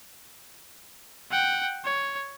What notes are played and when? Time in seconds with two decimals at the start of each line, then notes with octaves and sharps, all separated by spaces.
1.31 F#5 G5
1.85 C#5